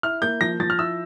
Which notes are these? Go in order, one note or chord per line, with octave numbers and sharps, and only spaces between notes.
E4 F6
A#3 G6
F3 A#6
F3 A6
F6
E4 E6